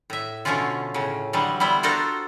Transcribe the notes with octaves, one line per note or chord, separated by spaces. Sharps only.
A2 E5
B2 D3 F3 A3 C#4 F4
A2 C#3
D3 E3 F#3 G3
G3 B3 E4 C5
D4 F4 F#4 A4 A#4 C5